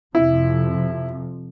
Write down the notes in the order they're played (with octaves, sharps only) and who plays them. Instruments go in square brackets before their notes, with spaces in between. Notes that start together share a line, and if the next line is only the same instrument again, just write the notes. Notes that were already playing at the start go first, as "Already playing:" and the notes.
[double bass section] F2 C3 F3 [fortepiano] E4